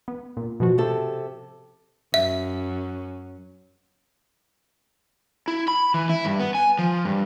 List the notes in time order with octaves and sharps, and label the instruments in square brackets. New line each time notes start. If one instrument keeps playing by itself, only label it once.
[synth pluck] B3
A#2
B2 F3 F#4
[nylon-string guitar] C3 A4
[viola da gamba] F#2 [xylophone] E5
[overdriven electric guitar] E4
B5
E3
E4
G2
B3
G#5
F3
G2